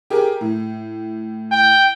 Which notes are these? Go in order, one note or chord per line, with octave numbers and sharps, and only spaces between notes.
G4 G#4 A#4
A2
G5